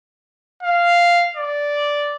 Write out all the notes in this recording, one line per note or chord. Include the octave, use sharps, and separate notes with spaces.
F5
D5